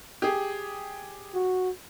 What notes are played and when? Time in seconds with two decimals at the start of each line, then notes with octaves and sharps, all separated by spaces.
0.22 G4 G#4
1.34 F#4